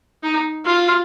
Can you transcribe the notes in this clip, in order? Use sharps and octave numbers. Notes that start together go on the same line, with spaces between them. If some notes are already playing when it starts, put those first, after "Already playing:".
D#4
F4